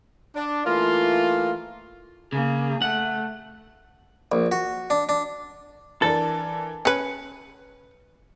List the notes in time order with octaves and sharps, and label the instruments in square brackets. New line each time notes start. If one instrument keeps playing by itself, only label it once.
[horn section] D4
E3 A3 A#3 F4
[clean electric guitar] C#3 [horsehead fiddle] A#3 G#4
[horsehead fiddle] A3 [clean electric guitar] F#5
[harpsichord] A#1
F#4
D4
D4
[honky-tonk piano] E3 D4 A#4 [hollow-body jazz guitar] A4
[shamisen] C#4 B4 [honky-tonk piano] C#7